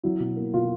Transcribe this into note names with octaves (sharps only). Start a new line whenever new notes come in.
F#3 E4
B2
A#3
B2 F4